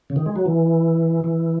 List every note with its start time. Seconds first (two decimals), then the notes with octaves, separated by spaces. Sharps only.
0.10 C#3
0.16 D#3
0.26 G#3
0.36 F#3
0.46 E3
1.24 E3